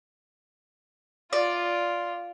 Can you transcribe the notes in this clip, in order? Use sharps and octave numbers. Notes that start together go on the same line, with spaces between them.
F4 D5